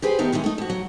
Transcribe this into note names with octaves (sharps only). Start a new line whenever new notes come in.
G4 G#4 B4 C5
D#3 A3 B3 D#4 G4
D#3 E3 F#3 G#3
A3 D#4
F2 F#4
F#3